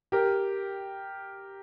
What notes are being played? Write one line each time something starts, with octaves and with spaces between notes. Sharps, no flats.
G4 A#4